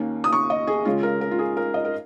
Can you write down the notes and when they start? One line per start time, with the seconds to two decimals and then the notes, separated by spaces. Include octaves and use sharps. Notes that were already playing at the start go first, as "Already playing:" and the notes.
Already playing: D#2 D#3 A#3 C#4
0.24 D#6
0.33 C#6
0.50 D#5
0.67 G#4
0.85 C#2 C#3 G#3 C#4 F4
1.03 A#4
1.21 A#4
1.31 F4
1.39 G#4
1.57 A#4
1.74 D#5
1.85 A#4